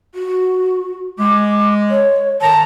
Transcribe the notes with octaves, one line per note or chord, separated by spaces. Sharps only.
F#4
G#3 D6
C#5
D#3 A5 A#5